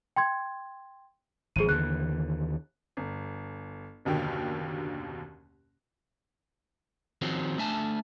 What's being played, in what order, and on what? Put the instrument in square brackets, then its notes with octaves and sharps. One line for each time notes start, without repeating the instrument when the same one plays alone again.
[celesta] G5 C6 G#6
[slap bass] G#1 F3 [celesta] G#4 D#7
[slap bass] D#2 D3 E3 [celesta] F#6
[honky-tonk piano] G1
F#1 D#2 B2 D3 G4 A#4
[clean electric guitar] D#3 F3 C4 C#4 F#4 G#4
A3 D4 E5 G#5 A5